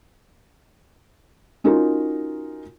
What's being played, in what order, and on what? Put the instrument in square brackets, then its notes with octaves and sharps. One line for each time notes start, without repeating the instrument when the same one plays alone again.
[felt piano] C#4 D#4 F4 F#4 A#4